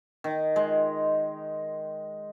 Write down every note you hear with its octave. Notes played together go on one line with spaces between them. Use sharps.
D#3
G#3